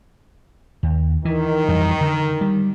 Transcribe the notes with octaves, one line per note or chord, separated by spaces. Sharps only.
D#2
D#3 E3
F2 E3 G3
D3
G3